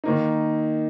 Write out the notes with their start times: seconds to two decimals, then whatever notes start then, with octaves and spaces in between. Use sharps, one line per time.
0.04 D#3 A#3 D#4